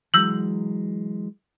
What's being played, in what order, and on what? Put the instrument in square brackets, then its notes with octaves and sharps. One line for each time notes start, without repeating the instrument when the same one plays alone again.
[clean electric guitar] E3 F#3 G#3 [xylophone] E6 G6 F#7